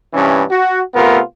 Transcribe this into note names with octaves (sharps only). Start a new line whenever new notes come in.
G2 C3 E3 C#4
F#4
C3 A3 B3 F4 A#4